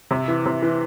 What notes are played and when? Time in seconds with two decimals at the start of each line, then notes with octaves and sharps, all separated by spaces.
0.11 C3
0.28 E3
0.46 C3
0.62 E3